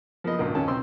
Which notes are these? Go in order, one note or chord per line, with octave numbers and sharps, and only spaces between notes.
F3 A#3 B3 D#5
G#1 C#2 G2 A#2
D#2 D#3 C#4 A5
B1 C4 C6 E6